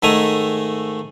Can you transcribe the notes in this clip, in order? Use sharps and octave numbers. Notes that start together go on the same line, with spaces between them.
G#2 D#3 A3 E5 G#5 A#5